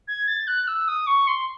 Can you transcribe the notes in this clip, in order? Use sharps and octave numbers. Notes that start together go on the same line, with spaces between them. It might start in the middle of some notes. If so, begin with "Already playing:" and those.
G#6
A6
F#6
E6
D#6
C#6
C6